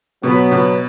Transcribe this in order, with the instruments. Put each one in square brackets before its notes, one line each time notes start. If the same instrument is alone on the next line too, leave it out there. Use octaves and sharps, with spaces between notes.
[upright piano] B2 [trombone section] F#3 B3
[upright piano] B2